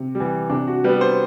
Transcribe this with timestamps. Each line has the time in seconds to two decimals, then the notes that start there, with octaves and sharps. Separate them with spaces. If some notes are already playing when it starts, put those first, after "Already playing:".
Already playing: C3
0.15 G3
0.20 E3
0.50 C3 D4
0.67 F#4
0.84 G3 B3 B4
1.01 C5